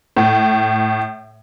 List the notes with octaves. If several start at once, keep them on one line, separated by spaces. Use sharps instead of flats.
A2